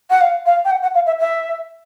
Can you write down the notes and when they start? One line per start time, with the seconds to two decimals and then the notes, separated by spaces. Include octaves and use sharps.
0.10 F#5
0.21 F5
0.46 F5
0.65 G5
0.71 F#5
0.82 F#5
0.95 F5
1.06 E5
1.20 E5